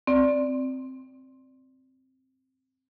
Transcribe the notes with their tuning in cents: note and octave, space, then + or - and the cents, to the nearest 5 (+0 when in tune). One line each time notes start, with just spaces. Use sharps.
C4 +0 D5 +0